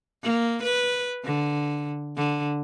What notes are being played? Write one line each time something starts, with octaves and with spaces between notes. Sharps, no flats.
A#3
B4
D3
D3